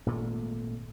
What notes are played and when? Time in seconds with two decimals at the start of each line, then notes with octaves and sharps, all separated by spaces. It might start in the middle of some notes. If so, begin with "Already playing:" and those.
0.06 G#1 A#2 A3